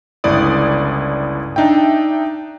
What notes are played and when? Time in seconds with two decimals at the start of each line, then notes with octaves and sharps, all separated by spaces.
0.24 G1 C#2 E4 D5 D#6
1.56 D4 D#4 E5 G5